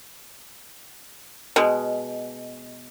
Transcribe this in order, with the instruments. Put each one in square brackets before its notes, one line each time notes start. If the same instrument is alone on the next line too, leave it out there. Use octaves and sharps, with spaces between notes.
[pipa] B2 G#3